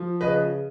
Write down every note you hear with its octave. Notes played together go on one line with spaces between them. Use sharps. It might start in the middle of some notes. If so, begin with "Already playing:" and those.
Already playing: F3
C#3 B4 D#5